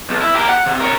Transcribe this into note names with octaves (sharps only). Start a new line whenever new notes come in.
B1
E4
G4 A#4
F#5
C3
A#4 C#5